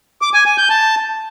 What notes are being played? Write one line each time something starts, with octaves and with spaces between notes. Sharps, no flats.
D6
G#5
G#5
G6
A5